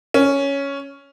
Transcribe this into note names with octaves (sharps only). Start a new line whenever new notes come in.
C#4